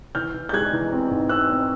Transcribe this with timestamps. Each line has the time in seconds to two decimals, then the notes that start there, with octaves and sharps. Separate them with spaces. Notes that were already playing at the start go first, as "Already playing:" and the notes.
0.15 E3 F6 G6
0.34 E3
0.49 G6
0.53 G#3 F#6 G#6
0.73 E3
0.92 C4
1.10 G#2
1.29 C4 E6 F#6
1.50 C4